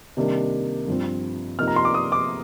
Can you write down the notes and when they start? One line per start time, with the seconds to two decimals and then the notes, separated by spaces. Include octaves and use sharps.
0.17 C3 D#3 G3 A#3 D4
0.88 G2 F3 C4
1.58 C3 F3 A#3 D#4 F6
1.67 A#5
1.76 C6
1.85 D6
1.94 D#6
2.12 D6